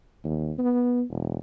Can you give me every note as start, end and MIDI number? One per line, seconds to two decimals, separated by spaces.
0.24 0.52 39
0.58 1.03 59
1.10 1.37 28